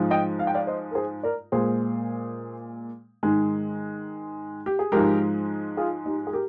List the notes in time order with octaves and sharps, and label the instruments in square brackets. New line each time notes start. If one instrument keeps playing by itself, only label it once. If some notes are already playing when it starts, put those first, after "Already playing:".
Already playing: [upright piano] G#2 F3 G#3
D#5 G5
F5
G5
D5 F5
C5 D#5
A#4
G#4 C5
A#4 D5
A#2 G#3 G#4 C5
G#2 D#3 G#3
G4
G#4
G#2 F3 G#3 G4 A#4
F4 G#4
D#4 G4
G#4
G4 A#4